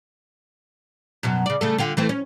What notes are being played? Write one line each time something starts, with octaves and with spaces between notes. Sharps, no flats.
F#2 B2 F#3
C#3 D5
C#3 A3 A4
D3 F4 G4
E3 A3 C4
C#4